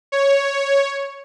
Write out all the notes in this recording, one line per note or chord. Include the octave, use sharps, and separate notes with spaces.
C#5